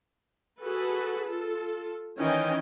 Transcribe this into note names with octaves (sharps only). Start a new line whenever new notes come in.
F#4 G#4 A4 B4
F4 A4
D#3 E3 C#4 D#5 G5